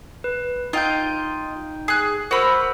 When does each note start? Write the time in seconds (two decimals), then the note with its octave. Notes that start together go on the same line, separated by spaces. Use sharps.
0.24 B4
0.73 D#4 F4 D#5 G5 G6
1.88 G#4 F#6
2.31 F#4 A#4 C5 B5 E6